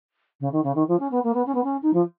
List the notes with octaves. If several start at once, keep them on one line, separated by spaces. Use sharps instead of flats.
C#3
D#3
C#3
D#3
F3
C#4
B3
A#3
B3
C#4
B3
C#4
D#4
F3